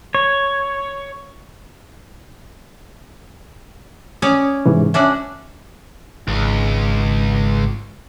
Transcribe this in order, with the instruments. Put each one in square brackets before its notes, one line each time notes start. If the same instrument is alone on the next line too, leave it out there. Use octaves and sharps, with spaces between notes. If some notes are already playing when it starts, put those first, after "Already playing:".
[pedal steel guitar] C#5
[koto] C#4 C#5 D5 [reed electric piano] D#6
[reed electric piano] G#2 C3 E3
[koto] C#4 D4 F#4 [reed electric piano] E5
[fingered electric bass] G#1 [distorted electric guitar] C#2